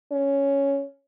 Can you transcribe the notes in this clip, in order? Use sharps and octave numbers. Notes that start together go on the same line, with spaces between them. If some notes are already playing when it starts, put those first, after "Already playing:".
C#4